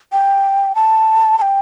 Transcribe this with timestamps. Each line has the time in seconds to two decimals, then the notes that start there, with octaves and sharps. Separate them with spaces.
0.12 G5
0.75 A5
1.38 A5
1.42 G5